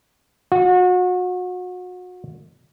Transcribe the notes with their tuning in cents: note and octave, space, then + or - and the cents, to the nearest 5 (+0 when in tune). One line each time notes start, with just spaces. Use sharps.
F#4 -35